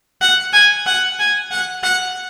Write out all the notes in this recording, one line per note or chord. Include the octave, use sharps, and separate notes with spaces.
F#5
G#5
F#5
G#5
F#5
F#5